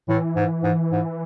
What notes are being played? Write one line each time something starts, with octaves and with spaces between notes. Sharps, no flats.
A2 E3
G#2
G#2
G#2